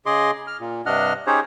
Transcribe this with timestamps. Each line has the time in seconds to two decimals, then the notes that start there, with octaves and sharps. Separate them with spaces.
0.06 C#3 G#4 D#5 C6 D6
0.47 F6
0.60 A#2
0.86 G2 C3 D4 D#5 F#5 F6
1.27 C#4 D#4 G4 G#4 C5 C#5